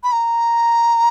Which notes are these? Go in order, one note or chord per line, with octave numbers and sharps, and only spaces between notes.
B5
A#5